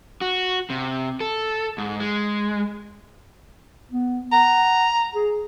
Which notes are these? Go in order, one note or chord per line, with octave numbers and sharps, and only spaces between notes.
F#4
C3
A4
G#2
G#3
B3
F#5 A#5
G#4